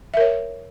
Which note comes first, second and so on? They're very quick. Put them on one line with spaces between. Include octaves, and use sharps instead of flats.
E5 A#4 C#5